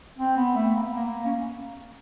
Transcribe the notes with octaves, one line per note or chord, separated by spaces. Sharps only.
C4
B3
A3
A#3
B3
A#3
C#4